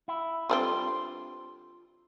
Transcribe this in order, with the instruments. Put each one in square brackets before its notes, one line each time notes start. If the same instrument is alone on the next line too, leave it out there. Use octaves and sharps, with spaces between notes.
[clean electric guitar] E4
[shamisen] D3 G3 C4 [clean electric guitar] F4 B5 C6